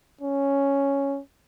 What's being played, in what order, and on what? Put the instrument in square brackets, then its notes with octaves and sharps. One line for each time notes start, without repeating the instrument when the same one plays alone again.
[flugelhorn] C#4